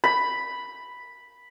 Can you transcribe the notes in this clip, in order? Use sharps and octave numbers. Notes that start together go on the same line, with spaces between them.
B5